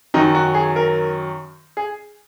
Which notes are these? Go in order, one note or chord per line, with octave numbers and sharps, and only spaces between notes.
F#2 D#3 F#3 D#4
F#4
G#4
A#4
G#4